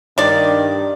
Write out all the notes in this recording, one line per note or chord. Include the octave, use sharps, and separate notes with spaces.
G2 D#3 D4 D5